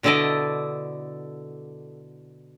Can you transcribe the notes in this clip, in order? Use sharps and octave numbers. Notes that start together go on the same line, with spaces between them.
B2 D3 E4 A4 D5 D#5